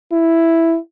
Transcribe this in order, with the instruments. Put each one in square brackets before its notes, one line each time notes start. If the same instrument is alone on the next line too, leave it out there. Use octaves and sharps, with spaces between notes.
[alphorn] E4